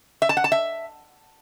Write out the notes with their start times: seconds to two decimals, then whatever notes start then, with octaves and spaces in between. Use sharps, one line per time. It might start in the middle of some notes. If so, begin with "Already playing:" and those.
0.22 E5
0.29 A5
0.37 F#5
0.44 A5
0.52 E5